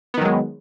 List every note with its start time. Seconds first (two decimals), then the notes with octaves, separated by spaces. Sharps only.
0.14 B3
0.18 D#3
0.21 F#3
0.25 G#3